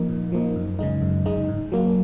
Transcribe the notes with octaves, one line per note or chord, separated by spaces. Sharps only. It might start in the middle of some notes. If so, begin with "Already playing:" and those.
Already playing: F3 A#3 D#4
A#2
F3 A#3 D#4
F#2
C#3 G#3 D#4
F#2
C#3 G#3 D#4
G#2
F#3 A#3